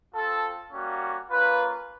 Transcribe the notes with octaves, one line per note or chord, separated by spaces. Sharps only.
C4 F4 A4
G3 A#3 C#4 F#4
A#3 C#4 F4 B4